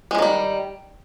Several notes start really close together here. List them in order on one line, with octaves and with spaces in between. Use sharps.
G#3 F3 D#3 G3